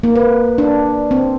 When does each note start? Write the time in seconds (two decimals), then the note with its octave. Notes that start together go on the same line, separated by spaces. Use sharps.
0.03 A#3
0.16 B4
0.58 D4
1.11 C4